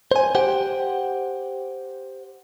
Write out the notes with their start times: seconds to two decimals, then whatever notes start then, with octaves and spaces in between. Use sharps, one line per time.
0.11 C5 G#5
0.35 G4 C5 F#5 G5